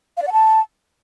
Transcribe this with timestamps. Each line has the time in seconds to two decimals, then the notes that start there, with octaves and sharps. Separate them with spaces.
0.17 F5
0.22 D5
0.27 F#5
0.32 A5